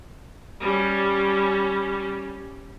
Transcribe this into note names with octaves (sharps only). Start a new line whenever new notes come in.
G3 C#4